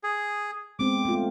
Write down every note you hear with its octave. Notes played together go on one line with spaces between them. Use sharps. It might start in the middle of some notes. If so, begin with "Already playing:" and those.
G#4
G#3 B3 C4 D6
A3 F4